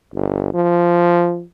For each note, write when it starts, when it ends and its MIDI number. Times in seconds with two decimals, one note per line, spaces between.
0.14 0.52 31
0.54 1.44 53